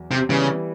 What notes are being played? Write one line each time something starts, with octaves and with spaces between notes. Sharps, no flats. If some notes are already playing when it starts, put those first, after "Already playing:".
Already playing: E2 F#3
C3
C#3 E3 G3 B3 E4